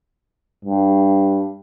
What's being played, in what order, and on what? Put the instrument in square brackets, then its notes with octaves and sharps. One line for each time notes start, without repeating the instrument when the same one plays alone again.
[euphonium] G2